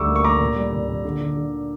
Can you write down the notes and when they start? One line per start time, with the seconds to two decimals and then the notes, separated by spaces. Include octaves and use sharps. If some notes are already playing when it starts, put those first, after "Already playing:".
Already playing: D2 G3 C#6 D6 E6
0.09 A#3
0.16 C#6
0.24 A#3 A#5 D6
0.40 A#2
0.56 G3
0.72 A#2
0.88 A#2
1.05 D3
1.21 D3
1.37 D3